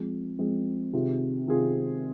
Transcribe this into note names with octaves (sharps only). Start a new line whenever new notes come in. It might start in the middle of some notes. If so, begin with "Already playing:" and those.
Already playing: F3 G#3 C4 G#4
F3 G#3 C4 G#4
C3 D#3 C4 F4 G#4
C3 D#3 C4 F4 G#4